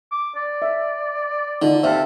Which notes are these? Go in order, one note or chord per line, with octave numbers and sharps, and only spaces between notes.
D6
D5
E5
D3 D#4 F4
C3 A4 E5 F5